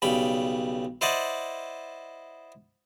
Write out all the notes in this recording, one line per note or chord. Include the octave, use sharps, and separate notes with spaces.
B1 C#3 G3 B5
E4 C5 D5 D#5 F#5 A5